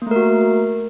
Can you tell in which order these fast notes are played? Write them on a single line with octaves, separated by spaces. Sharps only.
A#3 A3 A#4 F#4